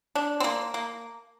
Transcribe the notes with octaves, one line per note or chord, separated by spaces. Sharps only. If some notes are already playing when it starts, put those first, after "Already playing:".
D4
C4
A#3
A#3